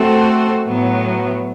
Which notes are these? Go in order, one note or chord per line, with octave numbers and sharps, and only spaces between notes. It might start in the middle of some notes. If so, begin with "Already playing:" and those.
Already playing: A3 C4 F#4 A4 C5
A2 F#3 B3